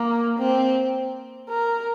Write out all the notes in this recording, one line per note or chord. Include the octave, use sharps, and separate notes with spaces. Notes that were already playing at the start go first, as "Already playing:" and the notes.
Already playing: A#3
C4
A#4